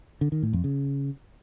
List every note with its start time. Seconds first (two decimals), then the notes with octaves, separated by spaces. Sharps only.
0.21 D3
0.32 D#3
0.43 A2
0.53 F2
0.64 C#3